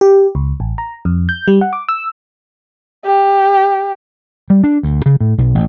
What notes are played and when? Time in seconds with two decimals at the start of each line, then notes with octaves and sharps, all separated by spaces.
0.01 G4
0.35 C#2
0.60 A1
0.78 A#5
1.05 F2
1.29 G6
1.48 G3
1.61 F#5
1.73 D6
1.89 E6
3.05 G4
4.50 G3
4.64 D4
4.83 D2
5.06 C#3
5.20 A2
5.38 B1
5.55 A1